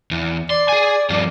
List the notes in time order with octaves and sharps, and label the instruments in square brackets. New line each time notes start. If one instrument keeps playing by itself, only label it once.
[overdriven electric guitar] E2
[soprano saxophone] D5 [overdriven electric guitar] C6
[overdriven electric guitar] G#4 G#5
G2 F3